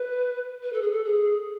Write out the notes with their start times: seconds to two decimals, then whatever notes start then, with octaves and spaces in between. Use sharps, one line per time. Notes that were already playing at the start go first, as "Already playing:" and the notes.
Already playing: B4
0.63 B4
0.73 A4
0.82 G#4
0.92 A4
1.05 G#4